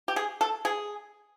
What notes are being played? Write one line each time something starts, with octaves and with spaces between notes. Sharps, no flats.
G4
G#4
A4
G#4